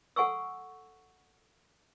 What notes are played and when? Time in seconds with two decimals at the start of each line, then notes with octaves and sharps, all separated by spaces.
0.16 A4 F#5 G#5 C#6 E6